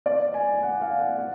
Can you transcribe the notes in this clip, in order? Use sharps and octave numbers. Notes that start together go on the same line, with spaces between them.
D5
G#5
F#5
F5
F#5
F#5